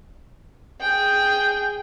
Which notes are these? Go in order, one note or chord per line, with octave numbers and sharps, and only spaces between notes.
G#4 G5